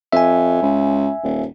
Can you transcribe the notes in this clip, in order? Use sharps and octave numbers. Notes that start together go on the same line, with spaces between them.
F2 E5 G#5
C#2
D#1